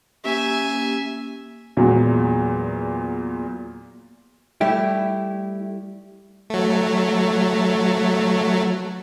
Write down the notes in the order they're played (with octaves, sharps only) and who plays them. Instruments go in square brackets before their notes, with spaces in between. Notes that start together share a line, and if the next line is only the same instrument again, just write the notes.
[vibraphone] A#3 C#4 G4 [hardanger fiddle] E5 G#5
[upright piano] E2 A#2 F#3 G#3
[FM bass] G3 [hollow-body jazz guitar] A3 E4 G4
[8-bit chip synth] F#3 A3